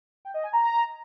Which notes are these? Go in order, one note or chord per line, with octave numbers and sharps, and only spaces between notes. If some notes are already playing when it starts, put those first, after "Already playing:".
G5
D#5
G#5
A#5